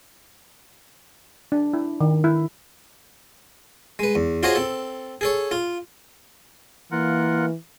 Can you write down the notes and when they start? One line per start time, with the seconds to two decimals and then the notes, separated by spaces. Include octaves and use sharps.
1.52 D4
1.73 E4
2.01 D#3
2.24 E4
3.99 G#3 B4
4.15 E2
4.43 F4 F#4 G#4 C5 C#5 D#5
4.55 C4 A4
5.21 G#4 A4 C#5
5.51 F4
6.92 E3 A#3 F4 A#4 F#5